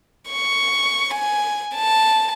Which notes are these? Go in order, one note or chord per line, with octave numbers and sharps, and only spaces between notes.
C#6
G#5
A5